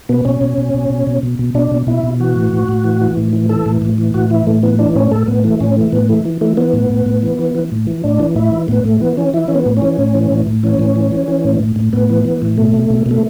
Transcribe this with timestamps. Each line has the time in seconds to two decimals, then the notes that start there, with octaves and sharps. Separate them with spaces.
0.09 B2 B3
0.25 B2 C#4
0.41 B2
0.58 B2
0.74 B2
0.90 B2
1.07 B2
1.23 B2
1.39 B2
1.54 B2 D4
1.72 B2
1.87 B2 E4
2.04 B2
2.20 E3 F#4
2.36 A2
2.53 A2
2.68 A2
2.84 E3
3.01 E3
3.17 A2
3.33 E3
3.49 E3 A4
3.66 A2
3.82 A2
3.98 E3
4.14 A2 F#4
4.30 E3 E4
4.47 A2 A3
4.63 E3 B3
4.79 E3 D4
4.96 A2 C#4
5.11 A2 A4
5.28 A2 B3
5.44 E3 A3
5.60 A2 C#4
5.76 E3 A3
5.92 A2 B3
6.09 E3 A3
6.25 E3
6.41 E3 A3
6.57 E3 B3
6.73 A2
6.90 A2
7.06 A2
7.22 E3
7.39 E3
7.55 E3
7.72 A2
7.87 E3
8.04 A2 D4
8.20 E3
8.35 A2 E4
8.52 E3
8.68 A2 B3
8.84 A2 A3
9.00 E3 B3
9.17 E3 C#4
9.34 E3 E4
9.48 E3 C#4
9.55 B3
9.66 A2
9.77 C#4
9.82 E3
9.98 A2
10.15 E3
10.31 A2
10.47 A2
10.63 E3 C#4
10.79 A2
10.96 E3
11.11 E3
11.28 E3
11.45 A2
11.60 A2
11.76 A2
11.93 A2 B3
12.10 E3
12.25 E3
12.42 A2
12.58 B2 A3
12.74 B2
12.90 B2
13.06 B2
13.11 A3